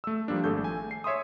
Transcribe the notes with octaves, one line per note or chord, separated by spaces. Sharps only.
A3 E6
F3 G3 A#3 D4
G#1 A3 G#4 A4 G6
G#5
C7
C#5 E5 C6 D#6